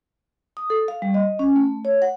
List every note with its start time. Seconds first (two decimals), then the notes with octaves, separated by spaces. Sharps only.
0.57 D#6
0.70 A4
0.88 F5
1.02 G3
1.14 D#5
1.39 C#4
1.56 A3
1.85 C#5
2.02 F#5